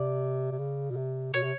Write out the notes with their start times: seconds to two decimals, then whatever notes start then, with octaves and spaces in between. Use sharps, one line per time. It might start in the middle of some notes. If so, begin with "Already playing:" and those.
Already playing: C3 D5
0.51 C3
0.58 C#3
0.91 B2
0.96 C3
1.34 B2 C#5
1.43 C3